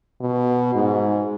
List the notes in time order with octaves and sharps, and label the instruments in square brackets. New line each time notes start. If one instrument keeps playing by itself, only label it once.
[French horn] B2
G#2